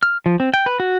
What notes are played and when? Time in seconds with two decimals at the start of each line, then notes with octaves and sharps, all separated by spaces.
0.03 F6
0.26 F3
0.40 C4
0.54 G5
0.66 B4
0.80 F#4